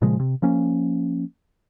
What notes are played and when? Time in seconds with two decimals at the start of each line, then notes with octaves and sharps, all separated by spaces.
0.02 A#2 C#3 F3 G#3
0.20 C3
0.42 F3 A#3 C#4